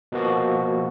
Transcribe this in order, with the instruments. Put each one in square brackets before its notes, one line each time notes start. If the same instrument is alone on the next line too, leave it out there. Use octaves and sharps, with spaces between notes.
[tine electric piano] B2 F3 A#3 F#4